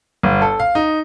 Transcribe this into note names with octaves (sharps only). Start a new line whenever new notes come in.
G1
A4
F5
D#4